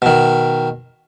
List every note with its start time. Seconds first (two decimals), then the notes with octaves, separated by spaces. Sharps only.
0.02 B2 D#3